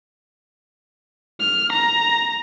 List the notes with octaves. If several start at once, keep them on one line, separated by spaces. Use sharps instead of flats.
F6
A#5